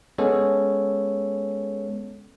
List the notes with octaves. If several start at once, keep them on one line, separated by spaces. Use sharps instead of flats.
G#3 B3 C#4 A4 C#5